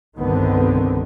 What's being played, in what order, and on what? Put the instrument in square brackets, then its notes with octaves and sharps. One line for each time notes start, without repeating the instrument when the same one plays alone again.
[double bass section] G1 C2 D3 D#3 B3 C4